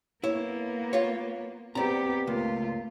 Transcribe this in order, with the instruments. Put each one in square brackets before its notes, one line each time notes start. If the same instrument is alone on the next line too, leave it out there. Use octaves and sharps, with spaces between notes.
[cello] A#3 B3 [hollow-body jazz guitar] E4 C#5
[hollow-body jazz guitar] F4 C#5
[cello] B3 G4 [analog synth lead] C4 [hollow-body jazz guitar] D5 A#5
[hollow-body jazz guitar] C#2 [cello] A3 F4 [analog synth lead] A#3